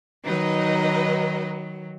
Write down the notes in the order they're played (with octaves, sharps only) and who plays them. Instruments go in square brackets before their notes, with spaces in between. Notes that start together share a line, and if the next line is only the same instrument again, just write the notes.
[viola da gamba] D#3 F#3 [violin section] D#4 B4 D#5